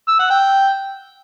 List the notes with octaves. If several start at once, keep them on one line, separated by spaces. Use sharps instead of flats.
E6
F#5
G5